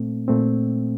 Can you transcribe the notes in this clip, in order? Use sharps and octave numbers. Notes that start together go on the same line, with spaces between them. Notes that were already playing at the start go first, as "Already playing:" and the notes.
Already playing: A#2 A3 C4
A#2 A3 C4